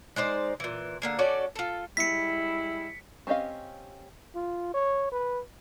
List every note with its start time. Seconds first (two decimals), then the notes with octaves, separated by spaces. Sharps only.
0.16 G#3 D#4 C5 D5
0.60 A#2 E3
1.02 D3 A#3 G#4
1.19 C#4 F#4 A4 D5
1.56 F4 A4
1.97 G3 G#3 E4 B6 C#7
3.27 C4 C#4 G4 D#5 F5
4.35 F4
4.74 C#5
5.12 B4